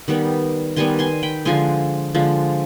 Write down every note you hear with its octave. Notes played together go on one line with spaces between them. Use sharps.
D#3 G3 B3
D#3 G3 B3 G#5 C6
G#5 C6
G5 B5
D3 F3 G#3 G#5 C6
D3 F3 G#3